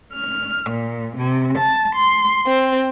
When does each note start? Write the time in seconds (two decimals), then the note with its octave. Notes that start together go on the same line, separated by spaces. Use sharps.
0.14 F6
0.70 A#2
1.17 C3
1.57 A5
1.95 C6
2.47 C4